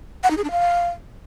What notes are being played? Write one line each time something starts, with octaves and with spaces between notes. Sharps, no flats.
F#5
D#4
G#4
D4
F5